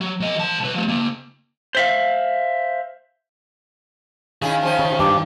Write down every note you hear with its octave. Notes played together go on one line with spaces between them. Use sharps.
F#3
F#3 D#5
E3 A5
C2 B4
F3 A3
C#3 A#3
C5 E5 F5
D#3 C#4 E4 G#4 F5
F3 C#4 C5
C#3
G2 D6